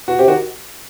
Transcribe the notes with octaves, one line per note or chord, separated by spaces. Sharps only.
B2 F#4
C3 G4
D#3 F#4